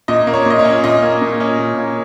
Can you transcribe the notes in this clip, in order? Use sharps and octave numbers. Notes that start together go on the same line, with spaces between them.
A#2 D#5
A#3
C#5
A#2 D#5
C#5
C#4
A#2 D#5
A#3
A#2
C#4
A#2
A#3